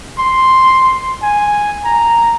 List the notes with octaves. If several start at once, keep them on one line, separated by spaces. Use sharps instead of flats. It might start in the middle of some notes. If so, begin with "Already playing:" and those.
C6
G#5
A#5